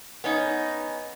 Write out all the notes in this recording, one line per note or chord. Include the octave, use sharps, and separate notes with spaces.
B3 C#4 D#4